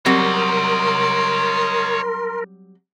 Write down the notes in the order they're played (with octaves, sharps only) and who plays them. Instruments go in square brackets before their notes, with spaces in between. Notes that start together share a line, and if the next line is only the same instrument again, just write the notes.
[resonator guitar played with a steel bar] F#3 G3 C4 [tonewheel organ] A#4 [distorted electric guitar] C#5 D#5 [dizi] C6